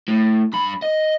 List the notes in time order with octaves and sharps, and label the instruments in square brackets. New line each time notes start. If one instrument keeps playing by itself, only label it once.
[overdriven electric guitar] A2
G2 B5
D#5